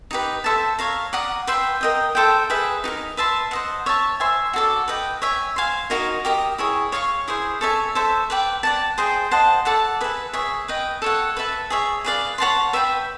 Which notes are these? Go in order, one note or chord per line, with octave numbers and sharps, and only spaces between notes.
D#4 G4 B4
A4 C5 E5 A5
C#5 F5 A#5
D5 F#5 A#5 D#6
B4 E5 G5 C6
A#4 D#5 G5
A4 C5 E5 G5
G#4 B4 E5
D#4 G4 A#4
B4 E5 A5 C6
C5 D#5 F#5
C#5 E5 A5
C5 E5 G#5 C6
F#4 A4 D5
B4 D#5 G5
C#5 E5 G#5
C5 F5 G#5 C6
D#4 F#4 A#4 D#5
G4 A#4 D#5
E4 G#4 C#5
C#5 F5 A#5 C#6
E4 G#4 C5
A4 C#5 E5 G#5
A4 C5 E5
B4 D5 G5
D5 F#5 A5
G#4 C5 D#5 G5
C5 D#5 F#5 A5
A4 D5 F#5 A5
G#4 B4 E5
G#4 C#5 E5
B4 D#5 G5
A4 C#5 F#5
B4 E5 A5
G#4 C#5 E5
G#4 B4 D5 F5
C#5 F#5 A5 C6
B4 E5 G5 B5